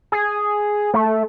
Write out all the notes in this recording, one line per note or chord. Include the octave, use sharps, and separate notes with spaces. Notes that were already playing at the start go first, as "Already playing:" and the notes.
G#4
A3